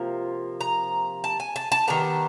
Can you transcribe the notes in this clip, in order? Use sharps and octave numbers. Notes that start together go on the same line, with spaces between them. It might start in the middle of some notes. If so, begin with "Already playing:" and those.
Already playing: C3 F3 A#3
A#5
A5
G#5
A5
A5
D#3 G3 B3 A#5